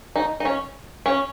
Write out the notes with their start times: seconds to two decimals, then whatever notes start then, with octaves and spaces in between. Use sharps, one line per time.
0.16 D#4
0.40 D#4
0.45 C#4
1.06 C#4